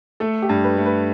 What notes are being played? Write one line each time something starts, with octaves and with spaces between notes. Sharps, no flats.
A3 A4
G4
G2
B4
A3
B4